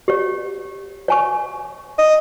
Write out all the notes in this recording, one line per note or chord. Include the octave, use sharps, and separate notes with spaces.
G4 C#5
C#5 G#5 C#6
D#5